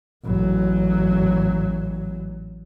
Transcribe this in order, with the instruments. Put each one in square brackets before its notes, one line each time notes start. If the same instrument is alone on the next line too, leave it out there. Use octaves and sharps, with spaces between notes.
[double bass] A1 F#3